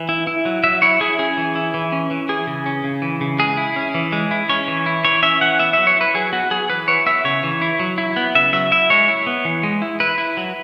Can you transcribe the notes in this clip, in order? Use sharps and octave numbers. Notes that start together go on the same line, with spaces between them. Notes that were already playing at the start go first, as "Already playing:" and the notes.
Already playing: E3
E4
E4
F#3
F#3 E5
E4 C#5
E4 G#4
C#4 G#4
E3
E4
E3
C#4
E3
E3 G#4
C#3
C#4
C#3
E3
C#3
G#3 G#4
E4
C#4
E3
G#3
E4
C#4 C#5
E3
E4
E3 C#5
C#4 E5
E3 F#5
B3 E5
F#3 E5
C#5
E4 B4
F#3 G#4
B3 F#4
F#3 G#4
E3 B4
E4 C#5
B3 E5
C#3 C#5
E3
E4
F#3
E4
B3
C#3 E5
F#3 E5
E4 E5
G#3 C#5
E4
B3
E3
G#3
E4
E4 B4
E4
F#3